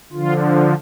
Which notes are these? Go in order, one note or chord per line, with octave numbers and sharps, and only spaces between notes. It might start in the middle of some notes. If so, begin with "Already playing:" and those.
D3 F3 F4